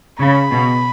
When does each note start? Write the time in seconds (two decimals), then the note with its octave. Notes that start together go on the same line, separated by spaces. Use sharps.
0.19 C#3 B5
0.51 B2